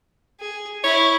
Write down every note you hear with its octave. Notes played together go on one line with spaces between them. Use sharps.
G#4
E4 C#5